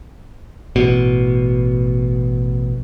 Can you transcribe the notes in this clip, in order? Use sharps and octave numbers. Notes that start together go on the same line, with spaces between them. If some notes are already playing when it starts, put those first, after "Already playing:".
A1 B2